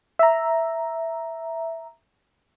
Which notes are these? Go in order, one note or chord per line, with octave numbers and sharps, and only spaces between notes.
E5 A#5